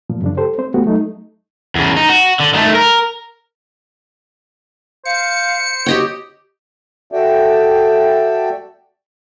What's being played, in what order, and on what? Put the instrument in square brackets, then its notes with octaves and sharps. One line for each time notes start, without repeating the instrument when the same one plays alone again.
[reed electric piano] A#2 F3
F#2 C#3 D4
G4 A4 C5
C4 C5
A3 B3 F#4 G4
F#3 A3 D#4
[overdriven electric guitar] E2 C#3
D#4
F#4
D3
D#3 A3
A#4
[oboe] C5 [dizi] F5 [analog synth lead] C#7
[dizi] F#4 [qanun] G4 D#5 G5 [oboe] C#5
[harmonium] F#4 A4 D5 E5 G5